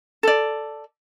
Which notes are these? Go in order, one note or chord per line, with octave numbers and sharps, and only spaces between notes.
A4 D5